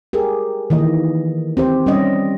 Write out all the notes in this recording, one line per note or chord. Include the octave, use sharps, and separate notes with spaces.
G4 G#4 A#4
D#3 E3 A#3 D#5
C4 G4 C5
G3 C#4 D#5